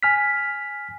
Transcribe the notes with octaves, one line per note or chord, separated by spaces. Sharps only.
G#5 F6 B6